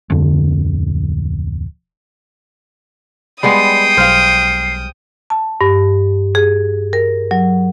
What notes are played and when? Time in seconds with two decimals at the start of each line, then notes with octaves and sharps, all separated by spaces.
0.10 D1 F2 D3
3.43 G3 G#3 B3 D5 G5 B5 D#6 C7
3.97 B1 C5 F5 F6
5.30 A5
5.61 G2
6.35 G#4
6.93 A#4
7.31 F#3